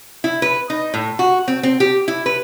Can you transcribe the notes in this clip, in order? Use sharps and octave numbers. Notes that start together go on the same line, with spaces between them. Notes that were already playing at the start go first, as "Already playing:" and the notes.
E4
B4
D#4
A2
F#4
C4
C4
G4
E4
B4